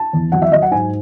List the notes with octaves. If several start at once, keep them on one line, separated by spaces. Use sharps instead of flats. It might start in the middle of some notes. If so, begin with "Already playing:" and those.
Already playing: A5
E2
F#3 F#5
E5
F#3 D#5
F#5
G#2 G#5